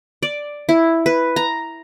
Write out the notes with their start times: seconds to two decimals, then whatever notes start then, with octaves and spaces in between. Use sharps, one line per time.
0.23 D5
0.69 E4
1.06 B4
1.36 A#5